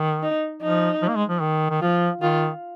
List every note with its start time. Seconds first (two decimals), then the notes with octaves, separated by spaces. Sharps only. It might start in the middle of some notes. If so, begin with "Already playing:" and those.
Already playing: D#3
0.23 D#4
0.62 F3 D#4
1.02 F3
1.08 A#3
1.15 G#3
1.29 F3
1.42 D#3
1.70 D#3
1.82 F3 F4
2.21 D#3 F4